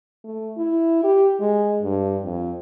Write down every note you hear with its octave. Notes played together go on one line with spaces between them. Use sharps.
A3
E4
G4
G#3
G2
F2